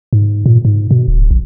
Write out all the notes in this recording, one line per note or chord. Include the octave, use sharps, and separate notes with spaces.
G#2
A#2
G#2
B2
D1
A#1